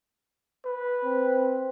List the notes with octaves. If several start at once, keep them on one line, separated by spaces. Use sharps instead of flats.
B4
C4